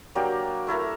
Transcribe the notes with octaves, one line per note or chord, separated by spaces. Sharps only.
F#3 A#3 D4 G4
A3 E4 A4 A#4